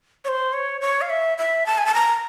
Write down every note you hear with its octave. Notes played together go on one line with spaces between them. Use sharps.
C#5
C5
C#5
C#5
F5
E5
E5
A5
G#5
A5
A#5